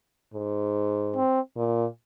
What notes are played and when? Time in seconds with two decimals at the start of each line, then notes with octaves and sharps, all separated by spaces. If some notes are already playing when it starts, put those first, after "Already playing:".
0.34 G#2
1.16 C4
1.56 A#2